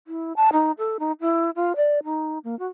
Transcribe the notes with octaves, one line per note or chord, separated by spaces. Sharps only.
E4
A5
D#4
A4
D#4
E4
F4
D5
D#4
A#3
F#4